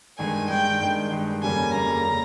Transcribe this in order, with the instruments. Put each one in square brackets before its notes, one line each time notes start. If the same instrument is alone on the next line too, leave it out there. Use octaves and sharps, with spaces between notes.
[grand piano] G2 D#3 G#3 [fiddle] G#5
[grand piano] G2 D#3 G#3 [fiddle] G5
[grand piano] G2 D#3 G#3
G2 D#3 G#3
[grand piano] F2 C#3 G3 A#3 [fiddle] G#5
[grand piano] F2 C#3 G3 A#3 [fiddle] A#5
[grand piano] C#3 G3 A#3